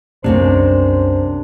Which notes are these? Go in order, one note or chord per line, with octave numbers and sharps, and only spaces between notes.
C2 F#2 C3 G3 A#3 C#4 D4 C5